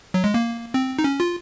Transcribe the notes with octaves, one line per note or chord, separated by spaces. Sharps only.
F#3
G#3
A#3
C4
D#4
C#4
F4